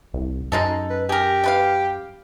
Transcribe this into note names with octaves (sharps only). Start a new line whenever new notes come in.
C2
F#2 G#3 D#4 A4
B4
G4 G#4 A#4
A3 B4 F5